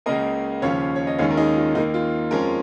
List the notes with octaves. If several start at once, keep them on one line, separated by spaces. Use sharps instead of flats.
C#2 C#3 A#3 A#4 D#5
D#2 C#3 F3 C#4 C#5 F5
C#5
D#5
D#2 D#3 G#3 C#4 C#5 F5
A#4
D#4 G#4
F4
D#2 D#3 A#3 D#4
F4
F2 F3 G#3 C#4 F4 A#4